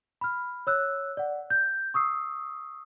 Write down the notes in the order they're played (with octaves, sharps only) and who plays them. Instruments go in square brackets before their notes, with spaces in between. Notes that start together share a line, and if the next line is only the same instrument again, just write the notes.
[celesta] B5 F6
C#5 E6 F#6
D5 F#5
G6
C#6 D#6 E6 C7